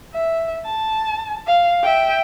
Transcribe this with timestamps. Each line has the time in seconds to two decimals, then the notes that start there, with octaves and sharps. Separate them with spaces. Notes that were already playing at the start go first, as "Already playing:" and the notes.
0.14 E5
0.65 A5
1.46 F5
1.83 E5 G5